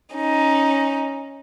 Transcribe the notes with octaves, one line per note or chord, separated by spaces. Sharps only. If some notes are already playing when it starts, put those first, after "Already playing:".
C#4 D#4